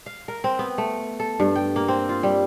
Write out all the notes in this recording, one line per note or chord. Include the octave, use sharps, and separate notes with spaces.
F5
A#4
C4
B3
A3
A4
G2
G5
A#3
C4
F4
G3